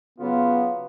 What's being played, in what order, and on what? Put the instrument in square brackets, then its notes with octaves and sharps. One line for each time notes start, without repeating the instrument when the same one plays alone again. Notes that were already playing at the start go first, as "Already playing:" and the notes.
[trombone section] C#3 F#3 F4 [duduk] B3